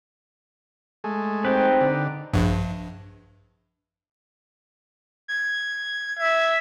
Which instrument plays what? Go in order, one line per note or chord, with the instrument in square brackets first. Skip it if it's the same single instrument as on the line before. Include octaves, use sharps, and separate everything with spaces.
[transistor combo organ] G#3 A3
[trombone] C4 [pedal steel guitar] D#4 G4 B4
[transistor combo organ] D3
[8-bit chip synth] A#1 G2
[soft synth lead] G#6
[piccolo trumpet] E5 [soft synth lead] G#6